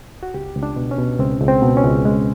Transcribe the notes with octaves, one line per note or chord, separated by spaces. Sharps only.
F#4
C#2 G4
C#2
D4
B2
C#4
B2
C#2 C4
C#2
C4
B2
C#4
C#2
G#3